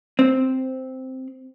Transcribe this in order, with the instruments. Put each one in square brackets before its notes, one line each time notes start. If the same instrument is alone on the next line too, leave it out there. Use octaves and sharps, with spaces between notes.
[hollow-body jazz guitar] C4